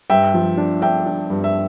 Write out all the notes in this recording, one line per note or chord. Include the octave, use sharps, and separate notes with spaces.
G2 E5 G5
F3
D4
D4 E5 G5
D4
G2
E5